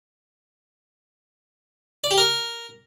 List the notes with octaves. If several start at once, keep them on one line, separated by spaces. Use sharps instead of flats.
D5
G4
A#4